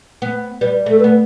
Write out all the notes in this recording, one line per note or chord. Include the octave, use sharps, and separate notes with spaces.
B3
G3 B4
A3 A4
B4
B3